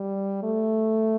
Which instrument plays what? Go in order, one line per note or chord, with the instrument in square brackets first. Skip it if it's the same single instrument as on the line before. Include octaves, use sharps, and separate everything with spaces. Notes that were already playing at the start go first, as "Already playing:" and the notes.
Already playing: [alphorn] G3
A3